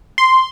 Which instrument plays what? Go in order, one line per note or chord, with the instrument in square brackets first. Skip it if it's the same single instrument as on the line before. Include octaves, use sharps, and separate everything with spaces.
[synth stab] C6